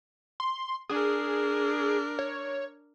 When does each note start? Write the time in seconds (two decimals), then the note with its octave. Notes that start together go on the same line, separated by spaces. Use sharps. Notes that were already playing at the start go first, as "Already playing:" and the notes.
0.40 C6
0.89 D4 G#4 A#4
2.19 C#5